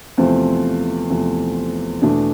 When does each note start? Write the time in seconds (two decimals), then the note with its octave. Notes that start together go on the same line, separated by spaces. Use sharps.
0.18 E2 C3 F3 A3 C4
1.10 E2 C3 F3 A3
2.02 E2 B2 A3 D4